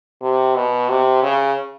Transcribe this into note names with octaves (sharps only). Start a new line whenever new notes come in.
C3
B2
C3
C#3